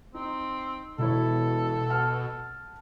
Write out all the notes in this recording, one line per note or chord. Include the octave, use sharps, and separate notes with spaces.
C4 D#4
E1 B2 E4 A4 C#5
F#5 A5 F6